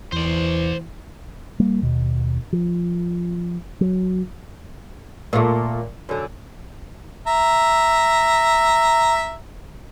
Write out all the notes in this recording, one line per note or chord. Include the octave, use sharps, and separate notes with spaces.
E2 E3 C5 D5
G3 A#3
D#2 B2
F3
F#3
A#2 A3
F#2 D3
E5 A#5